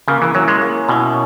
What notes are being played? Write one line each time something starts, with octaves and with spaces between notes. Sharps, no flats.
C#3 A#3
E3
F#3 C#4 E4
G#3
A#3
B2 C#4 E4